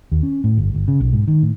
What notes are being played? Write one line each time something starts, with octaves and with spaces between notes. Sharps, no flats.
D#2
C#4
A2
G1
G1
C#3
B1
G#2
D#3
A2